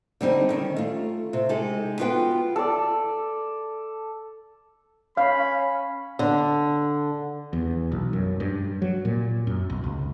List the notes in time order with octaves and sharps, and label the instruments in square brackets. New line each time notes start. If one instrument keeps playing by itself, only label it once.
[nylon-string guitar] D3 G3 C4 D#4
D#3 C#4
A3 F4
C3
G#3 D#4 G4 A4
B3 F4 F#4 B4 F5 G5
[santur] A4 D5
[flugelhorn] C#4 [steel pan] F5 [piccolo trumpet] B5
[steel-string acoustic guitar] D3
[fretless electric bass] E2
B1
F#2
G2
F#3
A#2
F#2
B1
C#2